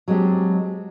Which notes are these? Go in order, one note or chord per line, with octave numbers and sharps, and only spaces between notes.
F#3 G#3 C4 D4 G4